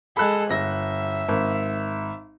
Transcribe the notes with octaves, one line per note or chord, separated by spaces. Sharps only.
G#3 A4 B5 F#6
G1 E5 A#6
G#1